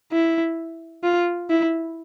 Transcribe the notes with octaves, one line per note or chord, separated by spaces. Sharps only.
E4
F4
E4